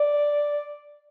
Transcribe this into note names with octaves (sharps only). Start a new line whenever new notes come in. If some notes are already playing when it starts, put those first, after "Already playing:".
Already playing: D5